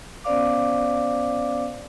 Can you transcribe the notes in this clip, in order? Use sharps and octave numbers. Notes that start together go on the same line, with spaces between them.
B3 C#4 C5 D5 F5 D6